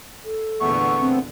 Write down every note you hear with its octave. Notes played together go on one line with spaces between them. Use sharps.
A4
E2 A#2 D3 A3 B3 C#6
C4